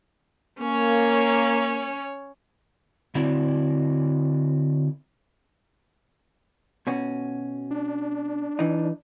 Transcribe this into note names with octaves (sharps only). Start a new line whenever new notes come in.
A#3 C#4 C#5
D3 C4 E4 F#4 D5
B2 C#4 F#4
D4
E3 D#4